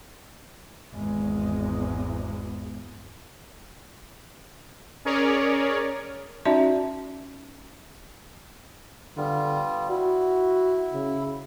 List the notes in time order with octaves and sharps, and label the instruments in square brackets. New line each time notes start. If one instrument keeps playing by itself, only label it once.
[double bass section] G#1 E2 G#3
[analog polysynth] C#4 G#4 A#4 C#5 D5
[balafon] C#4 D#4 F#4 D5 E5 A5
[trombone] D3 [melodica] G3 B3 F4
[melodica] E4 [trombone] F#4
[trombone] C#3